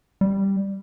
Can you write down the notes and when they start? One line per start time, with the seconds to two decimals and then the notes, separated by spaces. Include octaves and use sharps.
0.21 G3